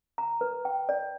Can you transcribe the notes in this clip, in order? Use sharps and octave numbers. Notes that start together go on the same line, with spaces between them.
A#5
B4
G5
D5